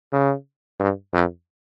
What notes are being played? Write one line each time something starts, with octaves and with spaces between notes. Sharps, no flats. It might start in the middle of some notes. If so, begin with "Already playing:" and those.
C#3
G2
F2